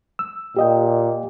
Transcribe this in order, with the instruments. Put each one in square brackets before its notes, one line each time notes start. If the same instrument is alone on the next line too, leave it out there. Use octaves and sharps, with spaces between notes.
[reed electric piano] E6
[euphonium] A#2 [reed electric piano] G4 D#5 G5